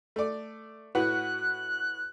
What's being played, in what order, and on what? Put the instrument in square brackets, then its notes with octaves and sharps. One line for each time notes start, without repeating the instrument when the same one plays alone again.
[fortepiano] A3 D5
[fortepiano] A2 F#4 B4 [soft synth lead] F#6